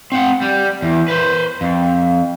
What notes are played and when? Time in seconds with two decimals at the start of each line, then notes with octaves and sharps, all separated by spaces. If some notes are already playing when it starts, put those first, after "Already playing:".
0.12 C4 F#5
0.42 G3
0.82 E2
1.08 B4 C5
1.61 F2